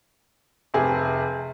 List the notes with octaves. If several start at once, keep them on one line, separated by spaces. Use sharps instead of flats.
F1 C3 G#4